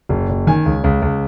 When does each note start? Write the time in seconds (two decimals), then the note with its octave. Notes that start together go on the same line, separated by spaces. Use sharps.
0.09 F#1
0.29 F#1
0.47 D#3 G#5
0.66 C#2
0.84 C#2
1.02 C#2